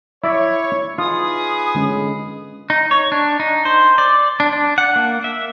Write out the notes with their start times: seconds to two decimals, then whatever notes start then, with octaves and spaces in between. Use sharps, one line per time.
0.24 E4 C#5 D5 E5
0.98 D#4 F4 G#4 B4 D#6
1.75 D3 G#3 C#4
2.70 D#4
2.91 C#5
3.12 D4
3.40 D#4
3.65 C5
3.98 D5
4.40 D4
4.53 D4
4.78 F#5
4.96 A#3
5.24 E5